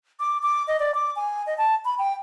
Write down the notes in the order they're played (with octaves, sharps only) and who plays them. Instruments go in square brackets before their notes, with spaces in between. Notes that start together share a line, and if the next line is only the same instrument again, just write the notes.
[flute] D6
D6
D#5
D5
D6
G#5
D#5
A5
B5
G5